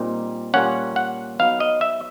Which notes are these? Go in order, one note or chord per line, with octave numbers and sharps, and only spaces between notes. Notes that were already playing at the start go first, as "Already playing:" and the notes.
Already playing: A#2 G3 C4 D#4
A#2 G3 A#3 C#4 F#5
F#5
F#3 B3 D#4 F5
D#5
E5